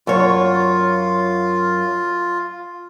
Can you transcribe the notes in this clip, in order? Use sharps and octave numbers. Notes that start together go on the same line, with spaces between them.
F#2 F4 C#5